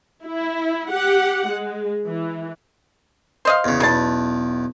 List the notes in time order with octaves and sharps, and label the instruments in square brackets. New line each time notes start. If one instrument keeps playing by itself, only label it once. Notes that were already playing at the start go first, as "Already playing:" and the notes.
[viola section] E4
G4 F#5
G#3
E3
[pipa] C5 D#5 F5
[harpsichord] E2 C#3
[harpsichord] B1 E2 [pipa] C#3 A5